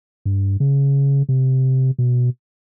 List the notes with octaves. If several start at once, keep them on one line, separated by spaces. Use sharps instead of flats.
G2
C#3
C3
B2